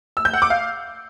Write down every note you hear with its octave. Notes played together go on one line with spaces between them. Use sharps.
E6
G6
F#5
D6
F5